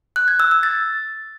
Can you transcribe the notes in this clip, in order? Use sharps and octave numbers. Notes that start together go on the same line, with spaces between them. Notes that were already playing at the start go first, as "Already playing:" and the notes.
F#6
G#6
E6
E6
A6